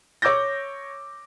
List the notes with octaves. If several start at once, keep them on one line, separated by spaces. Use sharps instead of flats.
C#5 D6 E6 G6 A#6